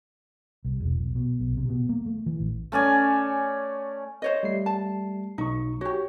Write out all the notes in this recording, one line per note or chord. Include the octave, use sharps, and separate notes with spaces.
C2
E1
B1
B2
B1
C3
B2
A#3
A3
E3
A1
A3 C#4 D5 G#5
C5 C#5 D#5
G3 A3 C7
A5
B1 D#4 C#6
F#4 G4 C#5